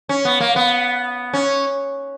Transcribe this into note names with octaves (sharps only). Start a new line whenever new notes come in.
C#4
B3
A#3
B3
C#4